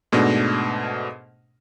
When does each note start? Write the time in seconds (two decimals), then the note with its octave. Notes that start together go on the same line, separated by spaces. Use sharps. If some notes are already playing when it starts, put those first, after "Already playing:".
0.12 G#2 B2 A3 D4